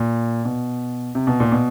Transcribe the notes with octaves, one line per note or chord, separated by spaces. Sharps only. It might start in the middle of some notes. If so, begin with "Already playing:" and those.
Already playing: A#2
B2
C3
B2
A#2
B2